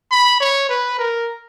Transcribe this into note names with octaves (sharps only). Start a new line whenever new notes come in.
B5
C#5
B4
A#4